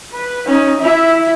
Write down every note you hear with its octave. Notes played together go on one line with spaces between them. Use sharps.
B4
C#4 D#4
E4 E5